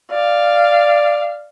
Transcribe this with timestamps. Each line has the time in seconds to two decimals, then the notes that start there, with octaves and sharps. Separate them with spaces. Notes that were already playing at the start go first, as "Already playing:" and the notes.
0.11 D5 F5